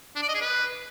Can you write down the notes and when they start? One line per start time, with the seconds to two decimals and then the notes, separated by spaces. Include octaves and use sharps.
0.16 D4
0.22 D5
0.28 D#5
0.35 G#4
0.41 B4